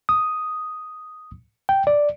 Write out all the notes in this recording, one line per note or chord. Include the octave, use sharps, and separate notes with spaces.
D#6
G5
D5